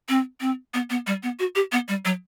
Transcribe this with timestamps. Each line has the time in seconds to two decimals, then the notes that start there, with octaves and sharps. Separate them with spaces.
0.09 C4
0.41 C4
0.74 B3
0.90 B3
1.07 G3
1.23 B3
1.39 F#4
1.56 G4
1.72 B3
1.88 G3
2.05 F#3